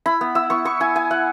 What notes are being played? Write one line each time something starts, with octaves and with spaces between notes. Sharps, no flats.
E4 B5
B3
E4 E6
B3 C#6
B3 C#6
E4 G#5
E4 G#5
E4 F#5